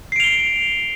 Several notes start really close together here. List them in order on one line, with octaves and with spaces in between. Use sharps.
C7 D7 F7 G7